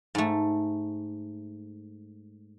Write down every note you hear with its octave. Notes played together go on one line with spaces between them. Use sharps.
G#2 A3